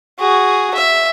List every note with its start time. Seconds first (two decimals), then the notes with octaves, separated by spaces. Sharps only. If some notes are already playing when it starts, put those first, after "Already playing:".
0.19 F#4 G#4
0.74 E5